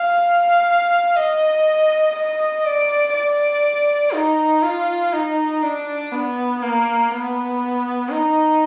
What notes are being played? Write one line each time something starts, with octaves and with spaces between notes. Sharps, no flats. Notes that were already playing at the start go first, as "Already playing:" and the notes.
Already playing: F5
D#5
D#5
D5
D5
D#4
F4
D#4
D4
B3
A#3
B3
D#4